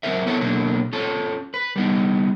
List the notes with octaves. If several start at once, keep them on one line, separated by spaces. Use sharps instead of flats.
F#3 C4 F#4 A#4 B4 E5
B3 C#4 E4 A4 C#5
B2 F#3 A3 A#3 D4
C#4 F4 A4
B4
G3 B3 D#4